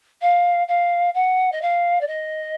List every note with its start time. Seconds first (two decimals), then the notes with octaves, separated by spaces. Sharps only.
0.22 F5
0.68 F5
1.14 F#5
1.52 D#5
1.62 F5
2.01 D5
2.07 D#5